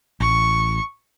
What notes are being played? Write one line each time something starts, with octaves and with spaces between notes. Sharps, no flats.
A1 C#6